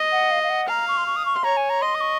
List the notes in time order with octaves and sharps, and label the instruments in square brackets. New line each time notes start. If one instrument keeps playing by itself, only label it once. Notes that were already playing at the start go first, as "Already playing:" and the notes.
Already playing: [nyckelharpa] D#5
[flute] F#5
F5
F5
F#5
[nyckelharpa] F5 [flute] A#5
[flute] C#6
C6
C#6
D#6
C#6
C6
[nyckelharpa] C#5 [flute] A#5
[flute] G#5
A#5
[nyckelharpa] D#5 [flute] C6
[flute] D#6
C#6